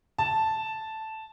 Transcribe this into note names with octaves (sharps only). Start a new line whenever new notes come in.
A5